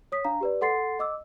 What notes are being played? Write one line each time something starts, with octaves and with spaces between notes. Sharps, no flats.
C#5 D#6 B6
D4 F5 A#5
G4 B4 D5
A4 F#5 C6 A6 C7
D#5 D6 E6